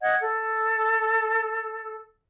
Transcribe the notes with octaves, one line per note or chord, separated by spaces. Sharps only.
D#5 F#5 G#6
A4